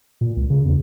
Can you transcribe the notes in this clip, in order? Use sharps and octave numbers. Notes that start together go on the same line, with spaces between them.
A#2
C#2
C#3
E2